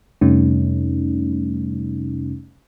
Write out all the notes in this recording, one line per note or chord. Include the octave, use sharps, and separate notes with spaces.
F2 C3 G3 A3 C#4 D#4